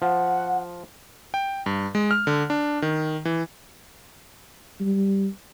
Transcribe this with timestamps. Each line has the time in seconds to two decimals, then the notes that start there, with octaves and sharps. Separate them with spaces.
0.02 F3 F#5
1.34 G5
1.66 G2
1.95 G#3
2.11 F6
2.27 D3
2.50 D4
2.82 D#3
3.25 E3
4.80 G3